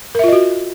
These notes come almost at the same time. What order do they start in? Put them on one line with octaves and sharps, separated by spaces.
A#4 E5 F4 D#5 F#4